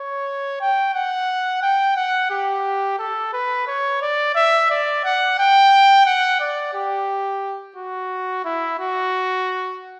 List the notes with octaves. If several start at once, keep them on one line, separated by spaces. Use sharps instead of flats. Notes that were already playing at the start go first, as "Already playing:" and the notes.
Already playing: C#5
G5
F#5
G5
F#5
G4
A4
B4
C#5
D5
E5
D5
F#5
G5
F#5
D5
G4
F#4
E4
F#4